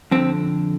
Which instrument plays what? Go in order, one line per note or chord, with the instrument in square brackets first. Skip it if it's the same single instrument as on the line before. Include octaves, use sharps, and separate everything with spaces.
[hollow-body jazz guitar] F2 D3 C4